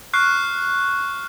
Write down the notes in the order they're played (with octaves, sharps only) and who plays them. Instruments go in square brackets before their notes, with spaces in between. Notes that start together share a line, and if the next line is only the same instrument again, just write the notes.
[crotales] C#6 F6 F#6 C7